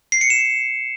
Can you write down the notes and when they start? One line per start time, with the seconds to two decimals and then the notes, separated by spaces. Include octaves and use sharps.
0.12 C7
0.21 C#7
0.30 E7